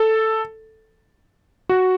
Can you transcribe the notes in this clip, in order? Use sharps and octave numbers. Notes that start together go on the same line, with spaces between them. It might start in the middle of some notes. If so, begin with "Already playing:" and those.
Already playing: A4
F#4